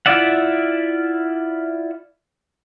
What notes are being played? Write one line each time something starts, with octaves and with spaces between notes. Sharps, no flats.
E4 F4 D5 E5 F#5